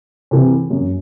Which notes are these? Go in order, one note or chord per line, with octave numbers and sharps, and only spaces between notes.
C3 E3
F#2